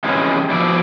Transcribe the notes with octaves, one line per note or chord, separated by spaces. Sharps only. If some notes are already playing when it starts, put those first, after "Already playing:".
C3 E3 G#3 C#4
B2 F3 E4 D5